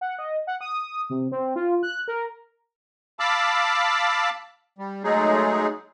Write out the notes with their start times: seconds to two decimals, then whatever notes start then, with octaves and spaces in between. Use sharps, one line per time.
0.01 F#5
0.19 D#5
0.47 F#5
0.61 D#6
1.10 C3
1.32 C4
1.56 F4
1.83 F#6
2.08 A#4
3.19 F5 A5 B5 D6 E6
4.78 G3
5.03 F#3 G#3 A3 D#4 G#4